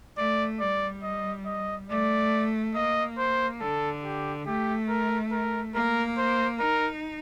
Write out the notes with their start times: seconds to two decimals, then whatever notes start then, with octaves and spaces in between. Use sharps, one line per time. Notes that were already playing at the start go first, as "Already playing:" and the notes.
0.18 A3 D5
0.60 G3 D5
1.03 D#5
1.46 D#5
1.89 A3 D5
2.75 A#3 D#5
3.18 C5
3.61 D3 A4
4.03 G4
4.46 A3 G4
4.89 A#4
5.32 A#4
5.74 A#3 A#4
6.18 C5
6.60 D#4 A#4